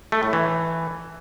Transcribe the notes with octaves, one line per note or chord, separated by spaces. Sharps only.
A3
A2
E3